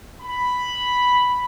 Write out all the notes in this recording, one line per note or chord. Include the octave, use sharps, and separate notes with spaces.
B5